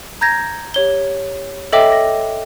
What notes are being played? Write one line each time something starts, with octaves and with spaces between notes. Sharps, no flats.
A#5 G6 G#6 A#6
G4 C#5 G7
A4 C#5 D#5 E5 G5 D6
D6 A#6